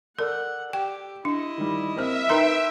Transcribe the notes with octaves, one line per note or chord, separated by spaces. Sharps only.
A4 A#4 D5 F#5
G4 G5
D4 E4 D#5
D#3 G3
A#3 C4 E5 F6
D#4 A#4 B4 G5 A#5 C6